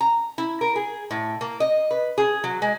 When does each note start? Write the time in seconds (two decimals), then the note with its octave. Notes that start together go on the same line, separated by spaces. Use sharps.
0.01 A#5
0.38 E4
0.61 A#4
0.76 G#4
1.11 A2
1.41 A#3
1.60 D#5
1.91 B4
2.18 G#4
2.44 F#3
2.62 G#3